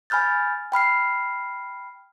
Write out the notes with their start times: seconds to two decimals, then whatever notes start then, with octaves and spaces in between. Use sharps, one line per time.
0.10 G#5 B5 F6 G6 A6
0.72 G5 B5 F6 C7